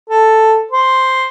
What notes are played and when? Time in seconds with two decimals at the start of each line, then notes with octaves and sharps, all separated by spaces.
0.10 A4
0.71 C5